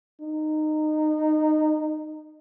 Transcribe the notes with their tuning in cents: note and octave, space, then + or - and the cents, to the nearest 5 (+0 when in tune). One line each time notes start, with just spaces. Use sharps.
D#4 -20